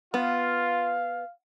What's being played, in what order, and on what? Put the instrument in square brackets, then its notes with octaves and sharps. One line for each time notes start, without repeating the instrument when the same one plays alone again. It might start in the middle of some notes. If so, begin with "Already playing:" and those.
[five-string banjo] B3 [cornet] F4 [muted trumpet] F5